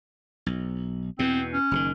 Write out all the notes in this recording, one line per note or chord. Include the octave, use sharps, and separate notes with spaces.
B1
E2 B2 C4
C#4
F#1 B2 D#3